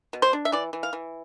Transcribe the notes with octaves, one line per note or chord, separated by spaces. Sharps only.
B2
C5
D4
E5
E3 D5
E3
F5
E3